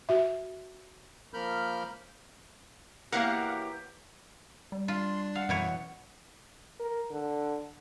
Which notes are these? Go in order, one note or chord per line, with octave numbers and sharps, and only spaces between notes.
F#4 E5
F3 A#3 A#4 B5 F6 G6
E3 F#3 A#3 E4 G4 A#4 F5 F#5
G3
D4 F4 C6
F5 F#5
F#2 B2 E3 C#5
A#4
D3